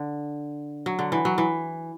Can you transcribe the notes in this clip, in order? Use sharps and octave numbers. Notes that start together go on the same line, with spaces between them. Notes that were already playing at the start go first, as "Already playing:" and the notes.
Already playing: D3
F#3
D3
E3
F#3
E3